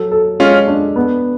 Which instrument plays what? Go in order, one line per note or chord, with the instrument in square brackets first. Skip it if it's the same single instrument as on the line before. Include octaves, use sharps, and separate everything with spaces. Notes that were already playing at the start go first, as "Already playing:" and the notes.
Already playing: [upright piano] F#3 A4
A4
[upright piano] G#3 [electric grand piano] C#4 F4
[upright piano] D4
B3